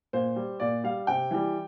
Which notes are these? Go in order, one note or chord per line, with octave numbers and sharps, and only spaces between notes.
A#2 C5
G3
A#2 D5
G3 F5
C3 G5
E3 G3